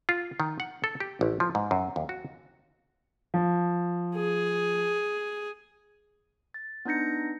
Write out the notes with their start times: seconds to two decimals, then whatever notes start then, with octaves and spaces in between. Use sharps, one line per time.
0.09 F4
0.40 D#3
0.60 F#5
0.84 A4
1.00 G4
1.21 A1
1.40 F3
1.55 G#2
1.71 F#2
1.96 D#2
2.09 F#4
3.34 F3
4.16 G#4
6.54 A6
6.85 B3 D4 D#4 G6 A#6 C#7